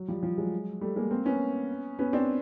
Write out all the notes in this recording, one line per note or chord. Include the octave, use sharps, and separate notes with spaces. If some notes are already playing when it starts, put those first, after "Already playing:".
Already playing: F#3
F3 G3
F3 G3
F#3 G#3
G3 A3
G#3 A#3
A#3 C4
B3 C#4
B3 C#4
C4 D4